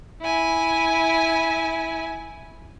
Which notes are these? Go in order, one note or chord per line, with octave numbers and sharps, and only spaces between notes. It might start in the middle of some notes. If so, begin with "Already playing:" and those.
E4 G#5